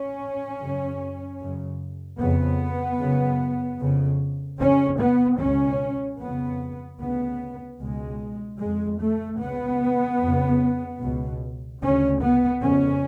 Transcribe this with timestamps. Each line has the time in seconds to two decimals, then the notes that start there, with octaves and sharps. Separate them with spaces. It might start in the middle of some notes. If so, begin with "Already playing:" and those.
Already playing: C#4
0.59 F#2 C#3
1.40 F#2 C#3
2.19 F2 C#3 B3
3.00 F#2 C#3
3.80 F2 C#3
4.60 F2 C#3 C#4
5.00 B3
5.40 C#2 B2 C#4
6.21 F2 C#3 B3
7.01 D2 C#3 B3
7.81 C#2 B2 G#3
8.61 F2 C#3 G#3
9.01 A3
9.41 C#2 C#3 B3
10.21 F2 C#3
11.01 C#2 B2
11.82 D2 C#3 C#4
12.21 B3
12.62 F2 C#3 C#4